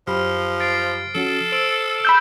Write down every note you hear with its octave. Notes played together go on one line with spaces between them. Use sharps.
F#2 F3 G4 B5 F6
A6 C7 D7
F3 C#4 F#4 A4
C5 E6 D7
B5 E6 G6